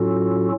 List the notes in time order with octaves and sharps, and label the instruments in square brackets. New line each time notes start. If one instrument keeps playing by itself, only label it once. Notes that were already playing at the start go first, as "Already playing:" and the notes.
Already playing: [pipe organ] A2 F#3 C#4 F4 F#4 A4